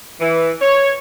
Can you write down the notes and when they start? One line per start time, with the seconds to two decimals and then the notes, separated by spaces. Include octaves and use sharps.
0.21 E3
0.62 C#5